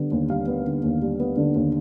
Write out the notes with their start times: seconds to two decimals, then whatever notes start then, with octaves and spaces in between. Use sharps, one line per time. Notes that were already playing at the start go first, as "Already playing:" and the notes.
Already playing: D3 G3 B3
0.12 D#2
0.30 G3 F5
0.47 B3
0.66 D3
0.84 D#2
1.02 G3
1.20 B3
1.37 D3
1.55 D#2